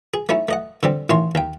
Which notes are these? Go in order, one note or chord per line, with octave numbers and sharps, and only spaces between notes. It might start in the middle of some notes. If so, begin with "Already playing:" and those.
G#4
A3 C#4 D#4 E4
A3 D#5 F#5
D3 G3 C4
A1 D#3 D#4 C#5 C6
D#2 G5